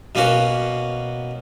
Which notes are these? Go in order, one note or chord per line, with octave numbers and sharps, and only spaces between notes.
B2 A#3 C#4 F#4